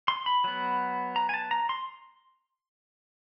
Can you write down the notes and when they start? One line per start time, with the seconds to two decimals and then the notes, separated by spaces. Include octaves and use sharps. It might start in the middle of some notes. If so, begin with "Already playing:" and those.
0.08 C6
0.26 B5
0.44 F#3 B3
1.16 A#5
1.29 G#5
1.34 A5
1.51 A#5
1.69 C6